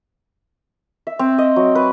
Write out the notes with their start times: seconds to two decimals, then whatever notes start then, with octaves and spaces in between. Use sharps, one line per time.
1.07 E5
1.19 C4
1.38 D#5
1.56 F#3
1.75 B4